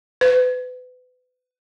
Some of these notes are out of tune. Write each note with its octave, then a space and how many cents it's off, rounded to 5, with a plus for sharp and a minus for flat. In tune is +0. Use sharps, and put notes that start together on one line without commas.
B4 +30